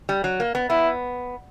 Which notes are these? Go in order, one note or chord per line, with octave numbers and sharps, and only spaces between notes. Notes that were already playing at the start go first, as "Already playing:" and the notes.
G3
F#3
A#3
B3
B3 E4